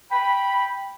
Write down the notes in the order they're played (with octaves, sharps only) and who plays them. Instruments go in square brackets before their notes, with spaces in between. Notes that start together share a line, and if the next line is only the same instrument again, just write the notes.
[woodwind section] G5 B5